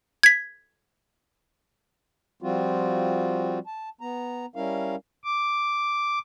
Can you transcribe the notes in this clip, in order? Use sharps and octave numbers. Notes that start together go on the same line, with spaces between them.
G#6 B6
F3 G3 C4 F4 F#4
A5
B3 A#5
G3 C#4 E4 A#4 F5
D6